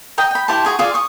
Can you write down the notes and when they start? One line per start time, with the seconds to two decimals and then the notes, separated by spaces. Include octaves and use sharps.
0.18 D#5 G5 A#5
0.31 G5 B5
0.48 E4 G4 C5 A5
0.65 F#4 G#4 G#5
0.79 F4 G#4 D5 F5
0.94 C#6 D#6